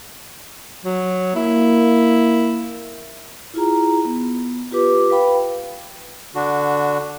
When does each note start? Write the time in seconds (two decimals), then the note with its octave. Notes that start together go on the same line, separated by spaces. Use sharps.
0.85 F#3
1.36 A#3 E4
3.54 E4 F4 G#4 A#5
4.05 B3
4.72 F4 G4 B4 D6
5.10 B4 F5 G5 B5
6.35 D3 D4 F#4